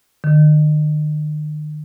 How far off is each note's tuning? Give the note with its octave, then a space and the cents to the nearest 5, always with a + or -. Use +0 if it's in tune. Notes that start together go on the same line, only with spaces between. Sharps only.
D#3 -45